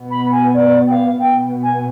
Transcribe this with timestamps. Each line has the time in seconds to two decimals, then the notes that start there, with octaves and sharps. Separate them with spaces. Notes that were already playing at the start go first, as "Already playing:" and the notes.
Already playing: B2 B3
0.10 B5
0.31 G#5
0.53 D5
0.87 G5
0.91 F5
1.18 B2 B3 G5
1.62 G#5